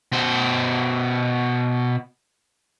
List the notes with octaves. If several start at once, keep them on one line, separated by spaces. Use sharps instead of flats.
B2 C5